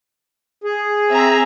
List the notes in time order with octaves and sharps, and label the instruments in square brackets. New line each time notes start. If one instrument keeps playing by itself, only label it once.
[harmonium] G#4
[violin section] C4 E5 A#5